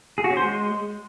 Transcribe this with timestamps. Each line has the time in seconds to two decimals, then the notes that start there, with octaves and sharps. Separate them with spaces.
0.18 G#4
0.24 F#4
0.31 C#4
0.37 C5
0.43 G#3